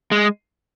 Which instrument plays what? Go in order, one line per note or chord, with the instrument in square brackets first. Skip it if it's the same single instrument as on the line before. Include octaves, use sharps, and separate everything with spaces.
[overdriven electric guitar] G#3